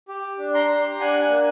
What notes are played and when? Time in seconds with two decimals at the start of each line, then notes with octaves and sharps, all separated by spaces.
0.09 G4
0.39 D4
0.54 A#5 C6
0.69 G4
1.00 D4 F#5 G#5
1.22 F#5 G#5
1.30 A#3